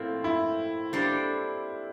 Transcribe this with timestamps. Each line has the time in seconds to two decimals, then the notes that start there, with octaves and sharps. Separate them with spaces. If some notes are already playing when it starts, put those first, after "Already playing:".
Already playing: A2 F3 A#3 C4
0.24 E4
0.93 G3 A#3 D4 A4 C5